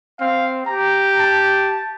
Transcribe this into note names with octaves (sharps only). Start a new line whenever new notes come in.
C4 F5
G4 A#5
A5